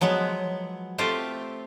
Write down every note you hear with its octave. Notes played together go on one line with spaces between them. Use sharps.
F3 F#3 G#3 B3
A3 C4 F4 G4 C5